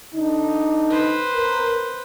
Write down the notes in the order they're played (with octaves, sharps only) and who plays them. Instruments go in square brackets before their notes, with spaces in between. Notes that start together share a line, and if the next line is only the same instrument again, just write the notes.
[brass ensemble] D3 D4 D#4
[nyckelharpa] B4 C5
[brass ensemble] A#4